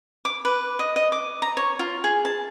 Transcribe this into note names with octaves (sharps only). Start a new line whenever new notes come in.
D6
B4
D#5
D#5
D6
A#5
C#5
F4
G#4
A5